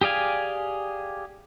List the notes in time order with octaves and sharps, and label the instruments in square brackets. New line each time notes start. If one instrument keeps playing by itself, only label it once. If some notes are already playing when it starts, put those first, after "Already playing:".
[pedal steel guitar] G4 G#4 D5 F5 G#5